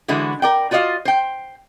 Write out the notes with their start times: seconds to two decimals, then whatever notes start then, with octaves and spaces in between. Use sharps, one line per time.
0.08 D3 E3 G#3 E4 F#4
0.42 A#4 D5 G5
0.71 F4 F#4 D5 D#5 F5
1.05 C5 G5